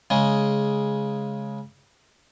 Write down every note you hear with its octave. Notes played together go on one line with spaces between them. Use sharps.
C#3 G#3